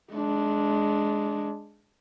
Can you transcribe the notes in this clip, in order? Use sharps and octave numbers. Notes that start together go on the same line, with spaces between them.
G#3 D4